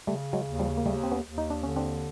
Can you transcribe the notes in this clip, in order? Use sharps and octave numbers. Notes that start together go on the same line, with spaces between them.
C#3 G3 A3
F#3 G#3
D#2
F3 G3
A#3
D#2 G3 A3
C4
B3 C#4
D#2
D#4
D4
D3 C#4
C4 D4